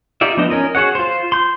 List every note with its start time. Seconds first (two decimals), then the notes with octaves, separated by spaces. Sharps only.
0.21 D#4 F4 G4 D5 E5
0.37 F3 B3 D4 D#4 D#5
0.50 C#4 A#4 D#5
0.75 F#4 G#4 C#5 F#5
0.95 F4 C5
1.32 C6 G6